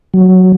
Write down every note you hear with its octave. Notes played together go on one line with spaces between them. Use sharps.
F#3